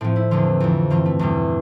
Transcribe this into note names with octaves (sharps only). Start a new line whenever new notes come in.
A2 F3 C4
E4
E2 D3 F3 F4
F2 E3
G2 E3 F4
A3
E2 B2 G3